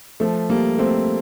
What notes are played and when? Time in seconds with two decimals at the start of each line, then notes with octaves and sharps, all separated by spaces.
0.20 F3 A3
0.50 G3 A#3
0.78 A3 C4